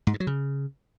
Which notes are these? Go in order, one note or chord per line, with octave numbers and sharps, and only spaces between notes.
G#2
G2
F#3
C#3